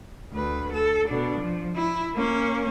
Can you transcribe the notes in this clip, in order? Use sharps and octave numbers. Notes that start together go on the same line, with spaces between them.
D2 B4
A4
B2 D4
F3
E4
A#3 C#4